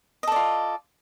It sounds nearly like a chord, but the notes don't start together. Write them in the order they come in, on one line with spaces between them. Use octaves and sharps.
D#5 A4 D5 F4